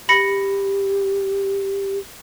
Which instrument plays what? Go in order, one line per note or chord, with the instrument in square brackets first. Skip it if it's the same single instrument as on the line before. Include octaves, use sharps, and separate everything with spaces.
[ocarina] G4 [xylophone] B5 A#6 C#7